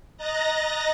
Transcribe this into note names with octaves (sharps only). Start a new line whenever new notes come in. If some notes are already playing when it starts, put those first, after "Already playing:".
D#5 A#5 F#6 A6 A#6